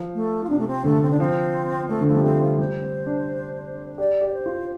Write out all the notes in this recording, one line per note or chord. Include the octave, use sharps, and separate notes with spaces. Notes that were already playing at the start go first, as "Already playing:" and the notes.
Already playing: F3
A3
F4
C3 D4
A3
C4
D3 A3
C4
D4
F3 C4
A3 C4
D3
F3 A3
G3
A3 C4
F4
G3 C5
C4
D4
G4 D5
G4
D5
C5
F4